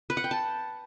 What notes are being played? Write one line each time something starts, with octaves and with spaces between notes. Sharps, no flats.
B4
F#5
G5
A5